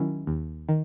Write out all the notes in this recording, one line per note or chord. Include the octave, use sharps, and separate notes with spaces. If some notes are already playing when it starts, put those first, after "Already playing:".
Already playing: D#3 F#3 C#4 E4
D#2
D#3